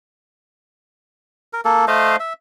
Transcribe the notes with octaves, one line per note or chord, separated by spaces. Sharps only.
A#4
A#3 A4
A3 C5 D#5 F5
E5